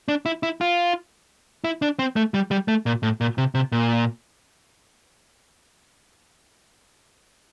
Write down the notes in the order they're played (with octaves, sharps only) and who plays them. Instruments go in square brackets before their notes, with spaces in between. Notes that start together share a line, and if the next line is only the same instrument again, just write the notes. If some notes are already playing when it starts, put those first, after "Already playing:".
[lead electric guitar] D4
E4
E4
F4
E4
D4
C4
A3
G3
G3
A3
A#2
A2
A#2
C3
C3
A#2